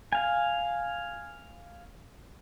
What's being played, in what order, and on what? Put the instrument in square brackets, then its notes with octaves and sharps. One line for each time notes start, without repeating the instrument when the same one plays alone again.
[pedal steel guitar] F5 G#5